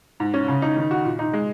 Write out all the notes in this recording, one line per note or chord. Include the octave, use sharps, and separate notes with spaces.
G#2
C#4
C#3
D#4
D#3
F#4
A#2
D#4
G#3